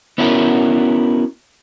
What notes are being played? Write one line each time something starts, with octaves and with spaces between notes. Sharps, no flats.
B3 C#4 E4 F#4 A#4